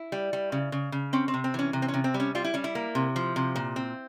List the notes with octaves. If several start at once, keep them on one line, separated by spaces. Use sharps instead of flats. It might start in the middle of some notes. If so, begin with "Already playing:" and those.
Already playing: E4
G3
G3
C#3
C#3
C#3
C4 C#4
C4
C3
C4
E3 C#4
C3
C4
C#4
C3
C4
G3
C#4
G3 F4
E4
G3 C#4
E4
A#3
C3
F3
C3
A#2
C4